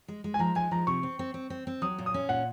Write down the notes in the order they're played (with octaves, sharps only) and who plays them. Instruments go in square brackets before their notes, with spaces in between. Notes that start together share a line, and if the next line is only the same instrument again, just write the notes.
[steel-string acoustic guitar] G#3
G#3
[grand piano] G#5
[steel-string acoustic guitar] F3 [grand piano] A#5
[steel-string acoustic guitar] G#3 [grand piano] G#5
[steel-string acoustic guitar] F3 [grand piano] A#5
[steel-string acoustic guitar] C3 [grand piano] C#6
[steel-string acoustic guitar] C4
C4
C4
C4
C4
[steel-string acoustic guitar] F#3 [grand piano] D#6
[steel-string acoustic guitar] A#2
[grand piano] D#6
[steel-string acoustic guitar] C#4
[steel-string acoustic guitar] A#2 [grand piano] F#5